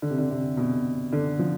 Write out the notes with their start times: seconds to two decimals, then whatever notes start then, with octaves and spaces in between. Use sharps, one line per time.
0.02 D3
0.11 C3
0.18 D3
0.30 C3
0.57 B2
1.13 D3
1.39 F3